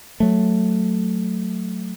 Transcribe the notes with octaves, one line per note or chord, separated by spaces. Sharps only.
F#3 A3